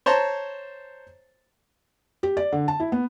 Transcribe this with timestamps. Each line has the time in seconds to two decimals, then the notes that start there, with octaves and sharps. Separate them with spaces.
0.06 C5 C#5 A5 A#5 C6
2.23 G4
2.37 D5
2.52 D3
2.68 A5
2.80 E4
2.92 B3